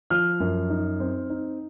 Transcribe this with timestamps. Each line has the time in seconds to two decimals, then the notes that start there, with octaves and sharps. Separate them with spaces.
0.10 F3 F6
0.40 F#2
0.70 D#4
1.00 C4
1.30 D#4